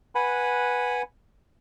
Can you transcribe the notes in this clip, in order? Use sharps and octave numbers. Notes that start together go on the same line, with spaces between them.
B4 F#5 G#5 B5